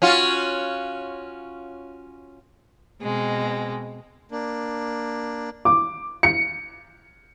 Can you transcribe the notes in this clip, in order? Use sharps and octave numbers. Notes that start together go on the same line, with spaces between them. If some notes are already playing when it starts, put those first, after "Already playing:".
C#4 F4 F#4
B2 G#3 C4
A#3 D4
D6
C#7